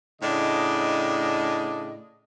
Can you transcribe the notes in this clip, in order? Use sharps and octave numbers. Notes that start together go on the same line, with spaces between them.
A2 C#3 D4 D#5